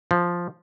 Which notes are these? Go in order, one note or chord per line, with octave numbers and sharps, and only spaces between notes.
F3